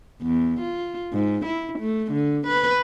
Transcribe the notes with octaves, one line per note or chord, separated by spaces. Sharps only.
E2
F4
G#2
E4
A3
D3
B4